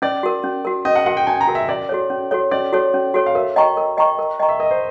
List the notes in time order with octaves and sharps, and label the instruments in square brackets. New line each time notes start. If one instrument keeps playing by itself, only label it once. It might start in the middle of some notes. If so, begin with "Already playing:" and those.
[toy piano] C#4 [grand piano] D5
[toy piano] F#4 A#4
C#4
F#4 A#4
[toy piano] C#4 [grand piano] D#5
[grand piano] F#5
[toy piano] F#4 A#4 [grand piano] F#5
[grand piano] G5
[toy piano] C#4 [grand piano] G#5
[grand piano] A#5
[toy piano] F#4 A#4
[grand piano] E5
[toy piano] C#4 [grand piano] D5
[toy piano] F#4 A4 C#5
C#4
F#4 A4 C#5
[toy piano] C#4 [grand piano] D5
[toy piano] F#4 A4 C#5
C#4
F#4 A4 C#5
[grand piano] F5
[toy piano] A#4 [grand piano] E5
[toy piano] D#5 G5 A#5 C#6
A#4
D#5 G5 A#5 C#6
A#4
D#5 G5 A#5 C#6
[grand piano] E5
[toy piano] A#4 [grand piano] D#5
[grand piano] C5